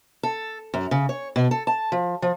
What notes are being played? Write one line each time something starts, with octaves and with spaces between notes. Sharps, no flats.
A4
F#2
C#3
C#5
B2
A4
A5
F3
F3